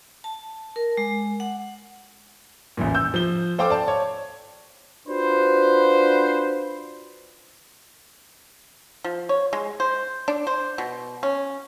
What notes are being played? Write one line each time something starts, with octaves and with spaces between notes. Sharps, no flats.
A5
A#4
G#3
F#5
A1 E2 A#2
E6 G6
F3 G7
A4 C5 F5 G5 D6
D5 A5
C#5
D4 F4 F#4 B4 C5
F3
C#5
G#3
C5
D4
C5
B2
C#4